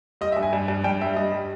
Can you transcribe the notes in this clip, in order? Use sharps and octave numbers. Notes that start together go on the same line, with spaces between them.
G3 D#5
E5
G2
G#5
G2
G2
G2 G5
G3 E5
G2 D#5
G3